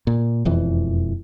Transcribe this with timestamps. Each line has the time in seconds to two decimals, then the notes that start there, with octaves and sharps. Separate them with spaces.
0.07 A#2
0.45 E1 F2 E3